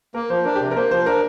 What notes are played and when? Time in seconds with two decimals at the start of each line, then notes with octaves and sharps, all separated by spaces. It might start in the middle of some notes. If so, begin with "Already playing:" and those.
0.14 A#3 A#4
0.30 F3 C5
0.45 D4 A#4
0.55 G4
0.60 C3
0.71 A#4
0.76 A#3 C5
0.91 F3 C5
1.06 D4 A#4